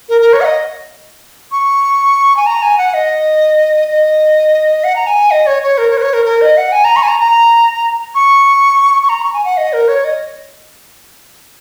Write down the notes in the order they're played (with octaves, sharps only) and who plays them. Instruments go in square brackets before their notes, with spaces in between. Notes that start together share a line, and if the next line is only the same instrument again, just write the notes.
[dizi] A#4
A#4
C#5
F#5
D#5
C#6
G#5
A#5
G#5
F#5
D#5
D#5
F#5
A#5
G#5
D#5
C#5
C#5
A#4
C#5
A#4
C#5
A#4
A#4
D#5
F#5
G#5
A#5
C#6
G#5
A#5
A#5
C#6
C#6
A#5
C#6
G#5
F#5
D#5
A#4
C#5
D#5